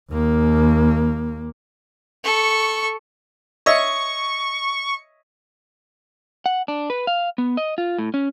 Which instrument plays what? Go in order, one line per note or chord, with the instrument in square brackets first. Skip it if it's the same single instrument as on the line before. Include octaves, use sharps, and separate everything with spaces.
[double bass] D#2 A#3
[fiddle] A4 C#6
[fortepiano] C#5 D#5 E5 [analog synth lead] C#6
[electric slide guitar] F#5
D4
B4
F5
B3
D#5
F4
A2
C#4